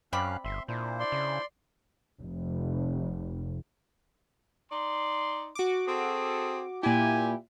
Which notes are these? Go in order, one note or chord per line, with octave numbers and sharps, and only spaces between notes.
F#2 C4 C#4 D5 F5 B5 F#6
G1 E5 C6
A#2 D4 E4 C5
D5 C6
C#3
F1
D#4 D5 C6
F#4 D6
C4 G#4 A4
A#2 E4 G4 G#5